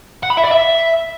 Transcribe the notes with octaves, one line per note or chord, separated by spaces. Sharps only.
F#5
B5
E5
D5
E5